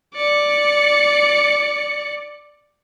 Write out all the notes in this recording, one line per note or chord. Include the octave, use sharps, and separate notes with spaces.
D5 C#7